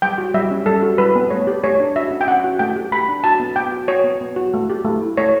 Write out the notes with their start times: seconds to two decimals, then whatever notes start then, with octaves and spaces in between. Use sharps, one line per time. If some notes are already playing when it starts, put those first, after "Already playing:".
0.02 G3 G5
0.18 F#4
0.34 G3 E5
0.51 C#4
0.66 G3 A4
0.82 F#4
0.98 G3 B4
1.15 B3
1.30 A3 C#5
1.47 G4
1.64 A3 C#5
1.80 D4
1.96 F#4 E5
2.11 C#4
2.21 G5
2.27 C#4 F#5
2.44 F#4
2.59 A3 G5
2.76 G4
2.92 A3 B5
3.09 D4
3.24 F#4 A5
3.40 B3
3.56 B3 G5
3.72 F#4
3.88 F#4 C#5
4.04 B3
4.21 B3
4.36 F#4
4.54 A3
4.70 G4
4.85 A3
5.02 E4
5.17 A3 C#5